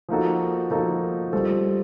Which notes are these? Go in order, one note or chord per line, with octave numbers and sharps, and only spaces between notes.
F3 A#3 D#4 F#4 A4
F3 A#3 D#4 F#4 A4
G3 C4 F4 A4